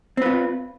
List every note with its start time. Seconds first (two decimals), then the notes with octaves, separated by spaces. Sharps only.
0.17 C4
0.22 B4
0.26 F4